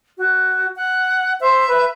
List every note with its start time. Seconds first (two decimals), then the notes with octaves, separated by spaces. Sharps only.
0.18 F#4
0.76 F#5
1.40 C5 E5
1.67 B4